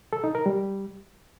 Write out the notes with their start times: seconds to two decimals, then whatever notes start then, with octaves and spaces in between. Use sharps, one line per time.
0.13 A4
0.24 D#4
0.35 A#4
0.46 G3